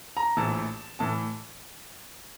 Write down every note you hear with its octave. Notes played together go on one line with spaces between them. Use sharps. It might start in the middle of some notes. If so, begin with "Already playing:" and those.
A#5
A#1 A2 E3 A5
A2 E3 A5